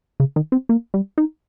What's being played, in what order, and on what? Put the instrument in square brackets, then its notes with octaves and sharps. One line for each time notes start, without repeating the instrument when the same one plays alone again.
[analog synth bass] C#3
D#3
C4
A#3
G3
D#4